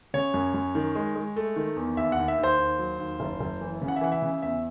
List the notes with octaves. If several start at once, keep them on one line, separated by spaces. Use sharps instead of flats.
C#3 C#5
F#2
F#2
D#3
G#3
G#3
A3
D#3
E2
D#2 E5
F#5
D#2
E5
D#2
C5
D#2
F#3
D#2
F#1
F#1
E3
C#3
F#5
E5
E3 F#5
E5
C#3
E2 E5